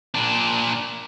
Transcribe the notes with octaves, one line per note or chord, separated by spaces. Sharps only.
A#2 D4